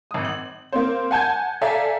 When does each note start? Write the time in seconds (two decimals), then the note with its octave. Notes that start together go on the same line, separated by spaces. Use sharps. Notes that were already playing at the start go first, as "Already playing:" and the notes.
0.11 G#1 D#6
0.25 F#7
0.72 A#3 C4 C5
1.11 F#5 G#5 A5 G6 G#6
1.61 A4 D5 E5 F5 G#5 A#5